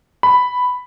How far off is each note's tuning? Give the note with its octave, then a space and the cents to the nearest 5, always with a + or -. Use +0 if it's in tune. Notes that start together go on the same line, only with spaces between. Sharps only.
B5 +5